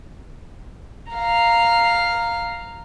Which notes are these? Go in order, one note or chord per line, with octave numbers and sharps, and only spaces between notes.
F5 A#5